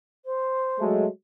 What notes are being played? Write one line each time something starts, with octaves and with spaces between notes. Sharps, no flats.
C5
F#3 G#3 A3